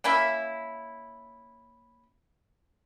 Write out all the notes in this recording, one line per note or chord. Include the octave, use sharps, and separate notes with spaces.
A#3 C#4 E4 E5